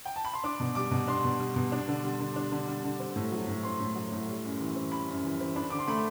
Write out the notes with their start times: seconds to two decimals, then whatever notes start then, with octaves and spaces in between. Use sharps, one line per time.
0.05 G5
0.16 A5
0.25 B5
0.34 C6
0.44 D4 D6
0.60 B2
0.75 G3 D6
0.91 B2
1.08 D4 C6
1.24 B2
1.40 G3
1.56 B2
1.72 D4
1.88 D3
2.03 G3
2.20 D3
2.36 D4
2.51 D3
2.68 G3
2.84 D3
3.00 C4
3.16 A2
3.32 F#3
3.48 A2
3.63 C4 C6
3.80 A2
3.96 F#3
4.12 A2
4.28 G3
4.44 F#2
4.61 E3
4.76 C4
4.91 G3 B5
5.09 F#2
5.25 E3
5.40 C4
5.56 D4 B5
5.70 D3 D6
5.79 C6
5.88 A3 B5